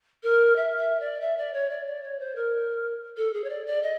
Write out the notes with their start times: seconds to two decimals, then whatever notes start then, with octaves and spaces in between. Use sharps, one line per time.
0.23 A#4
0.55 E5
0.77 E5
0.99 D5
1.20 E5
1.37 D5
1.53 C#5
1.69 D5
1.86 D5
2.02 C#5
2.19 C5
2.35 A#4
3.17 A4
3.33 G#4
3.44 C#5
3.49 D5
3.66 D5
3.82 D#5